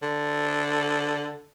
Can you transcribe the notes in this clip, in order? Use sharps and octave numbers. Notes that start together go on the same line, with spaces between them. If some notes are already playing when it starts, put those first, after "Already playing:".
D3